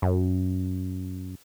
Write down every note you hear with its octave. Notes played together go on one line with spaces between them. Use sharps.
F#2